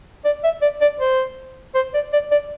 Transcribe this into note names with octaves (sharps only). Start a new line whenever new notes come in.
D5
E5
D5
D5
C5
C5
D5
D5
D5